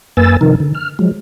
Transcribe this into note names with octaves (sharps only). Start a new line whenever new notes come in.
F#2 A#3 B4 G#5 E6 A6
C3 D#3 F3 D#4 A#4
D3
F6
F3 F#3 G#3